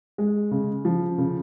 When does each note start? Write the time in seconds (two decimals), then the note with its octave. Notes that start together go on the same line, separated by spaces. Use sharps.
0.18 G#3
0.51 C#3
0.85 F3
1.18 C#3